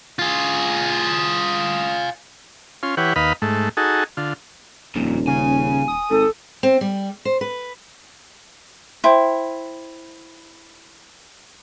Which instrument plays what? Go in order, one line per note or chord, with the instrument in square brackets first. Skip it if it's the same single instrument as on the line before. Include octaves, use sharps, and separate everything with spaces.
[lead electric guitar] F4 G#4
[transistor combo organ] C#4 F4 C6
E3 G4 B4 C#5 F#5
D#2 B4 D#5 F5 B5
G#2 A3
D#4 F#4 G#4 A4
D3 F4
[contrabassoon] D#1 [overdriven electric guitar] F2 A#2
[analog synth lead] C#3 [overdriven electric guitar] G#5
[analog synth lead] D#6
[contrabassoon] G#1 [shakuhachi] A4
[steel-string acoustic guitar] C4
G3
C5
B4
[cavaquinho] E4 [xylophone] C5 G5 C6